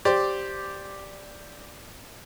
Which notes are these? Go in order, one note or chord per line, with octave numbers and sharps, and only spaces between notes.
G4 C5 D5